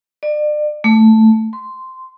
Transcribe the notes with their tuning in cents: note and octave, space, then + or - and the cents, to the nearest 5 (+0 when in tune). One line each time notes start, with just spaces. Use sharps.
D5 +35
A3 +5
C6 -10